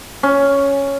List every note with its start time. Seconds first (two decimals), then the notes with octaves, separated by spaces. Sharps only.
0.23 C#4